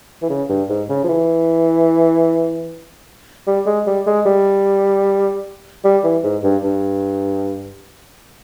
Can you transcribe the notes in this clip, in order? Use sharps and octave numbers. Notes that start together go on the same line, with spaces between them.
E3
C#3
G2
G#2
C#3
F3
E3
G3
G#3
G3
G#3
G3
G3
E3
G#2
G2
G2